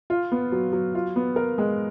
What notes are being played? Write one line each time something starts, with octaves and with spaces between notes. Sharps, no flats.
F4
B3
F#3
F#3
F4
B3
A#4
G#3